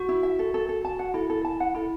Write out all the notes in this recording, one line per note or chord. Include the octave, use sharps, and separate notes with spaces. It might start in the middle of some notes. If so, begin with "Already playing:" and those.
Already playing: F#4
E4
E5
A4
A4
A4
A5
F#5
E4 A4
A4
A5
F#5
E4 A4